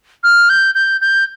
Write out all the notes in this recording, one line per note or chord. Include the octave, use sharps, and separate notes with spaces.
F6
G6
G6
G6